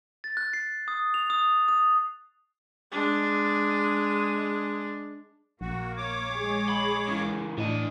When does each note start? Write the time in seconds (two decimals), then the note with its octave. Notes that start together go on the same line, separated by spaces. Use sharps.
0.24 A6
0.37 F#6
0.53 C7
0.88 D#6
1.14 F7
1.30 D#6
1.68 D#6
2.91 G#3 D4
5.61 A#1 A#3 F#4
5.97 C#5 D6
6.35 G#3 G#4
6.69 B5
7.08 C#3 E3
7.58 A2 E3 D4 D#5